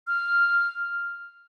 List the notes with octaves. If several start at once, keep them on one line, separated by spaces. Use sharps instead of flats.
F6